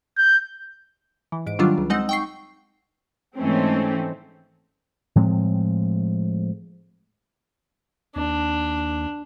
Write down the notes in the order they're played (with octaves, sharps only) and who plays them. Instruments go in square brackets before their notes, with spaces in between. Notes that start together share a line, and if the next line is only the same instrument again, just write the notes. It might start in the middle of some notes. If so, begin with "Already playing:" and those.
[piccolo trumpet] G6
[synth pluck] E3
G#2 D7
D#3 F#3 G3 D4 F4
C#2
G#3 C4 D#4 D#5 F#5 E6
G5 C#6 C7
[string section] G#2 E3 A3 C4 C#4
[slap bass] A2 F3 G#3 C4
[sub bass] D#2 [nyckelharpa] D4